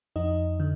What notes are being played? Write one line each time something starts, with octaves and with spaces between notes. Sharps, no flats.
F2 D#4 D#5
D3